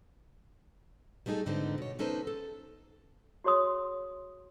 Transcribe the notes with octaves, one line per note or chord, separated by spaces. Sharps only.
G3 A3 B3 D#4 G#4 A4
F2 G#2 D3 B3 C4 D#4
B2 C#5
B3 C#4 D#4 A4 B4 C5
A4
F#4 G#4 C#5 C6 D#6